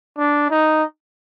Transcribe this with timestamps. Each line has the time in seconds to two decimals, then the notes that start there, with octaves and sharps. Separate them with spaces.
0.18 D4
0.50 D#4